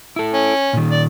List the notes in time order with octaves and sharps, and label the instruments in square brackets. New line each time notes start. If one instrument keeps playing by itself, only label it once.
[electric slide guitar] E4 A4
[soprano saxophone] C#4
[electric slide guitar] A#2 D#3
[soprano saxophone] D5